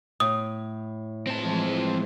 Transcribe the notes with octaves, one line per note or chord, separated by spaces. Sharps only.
A2 D#6
E3 F3 G#3 C4 A5